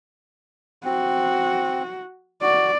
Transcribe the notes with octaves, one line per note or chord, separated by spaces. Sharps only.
C4 F#4
F#4 D5